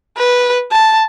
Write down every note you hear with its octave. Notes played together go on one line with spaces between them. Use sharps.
B4
A5